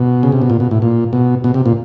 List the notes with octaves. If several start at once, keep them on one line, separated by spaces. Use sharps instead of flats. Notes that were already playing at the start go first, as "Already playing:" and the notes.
Already playing: B2
C#3
C3
B2
A#2
B2
A2
A#2
B2
B2
C3
A#2